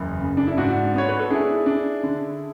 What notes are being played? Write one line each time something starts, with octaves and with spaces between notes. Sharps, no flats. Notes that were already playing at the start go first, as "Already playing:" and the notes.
Already playing: F#1 E2
C#3
D4
E4
G#2 D4 F#4
B3 C#5
B4
A4
D4 E4 G#4
D4
D3